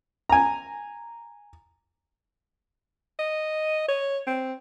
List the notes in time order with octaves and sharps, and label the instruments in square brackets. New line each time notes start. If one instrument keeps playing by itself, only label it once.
[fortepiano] G#5 A#5
[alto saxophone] D#5
C#5
C4